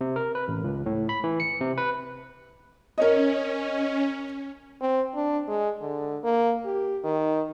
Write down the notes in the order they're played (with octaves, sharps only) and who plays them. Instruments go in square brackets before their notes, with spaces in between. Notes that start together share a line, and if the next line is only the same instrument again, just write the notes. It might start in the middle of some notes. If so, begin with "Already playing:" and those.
[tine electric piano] C3
A#4
B4
A1
C#2
A2
B5
E3
C#7
C3
B4
[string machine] C#4 [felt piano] A#4 C#5 D#5
[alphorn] C4
D4
G#3
D3
A#3
G4
D#3